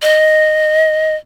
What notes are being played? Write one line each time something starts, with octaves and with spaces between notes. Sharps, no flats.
D#5